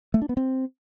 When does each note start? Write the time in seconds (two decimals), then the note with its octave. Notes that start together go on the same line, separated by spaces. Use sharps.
0.14 A3
0.22 D4
0.29 B3
0.37 C4